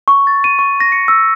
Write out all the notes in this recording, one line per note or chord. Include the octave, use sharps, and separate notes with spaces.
C#6
A6
D#7
C#6
A#6
C#7
E6